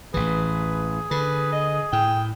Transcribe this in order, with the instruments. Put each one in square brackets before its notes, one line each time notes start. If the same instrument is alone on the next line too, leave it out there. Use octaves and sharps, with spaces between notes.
[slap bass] A1 E3 [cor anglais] G#4 [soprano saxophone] B4
[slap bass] D3 [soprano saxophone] B4
[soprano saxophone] D#5
[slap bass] A2 [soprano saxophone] G5